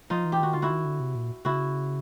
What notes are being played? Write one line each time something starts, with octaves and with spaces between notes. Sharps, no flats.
F3 D#4 F4
E3
G4
D#3 F#4
D3 F4
E4 F#4
D#3
D3
C3
A#2
C#3 E4 F#4